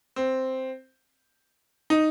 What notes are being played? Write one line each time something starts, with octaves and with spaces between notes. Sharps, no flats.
C4
D#4